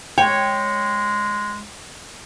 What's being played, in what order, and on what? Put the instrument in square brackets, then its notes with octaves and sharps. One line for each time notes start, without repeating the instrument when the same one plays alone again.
[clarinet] G#3 [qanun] C#5 [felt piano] G5